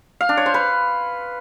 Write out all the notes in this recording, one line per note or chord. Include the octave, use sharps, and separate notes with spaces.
F5
D4
C#5
C5
B4